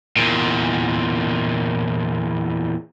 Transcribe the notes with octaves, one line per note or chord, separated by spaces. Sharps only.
E2 A#2